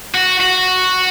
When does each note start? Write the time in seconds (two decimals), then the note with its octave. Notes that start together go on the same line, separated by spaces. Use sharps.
0.15 F#4
0.40 F#4